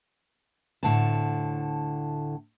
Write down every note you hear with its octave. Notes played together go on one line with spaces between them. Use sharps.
D2 A2 D3 A5